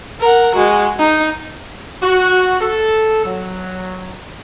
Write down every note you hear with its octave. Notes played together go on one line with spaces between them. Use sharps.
A#4 F#5
G#3 F#4
D#4
F#4
A4
F#3